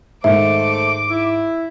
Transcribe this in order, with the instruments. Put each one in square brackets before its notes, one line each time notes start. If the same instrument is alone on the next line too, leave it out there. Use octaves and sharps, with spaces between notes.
[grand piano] G#2 D#3 [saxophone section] A3 C5 [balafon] E5 [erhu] D6
[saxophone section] E4